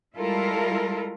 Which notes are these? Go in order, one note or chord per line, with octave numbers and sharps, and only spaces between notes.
G3 G#3 E4 F4 A4 A#4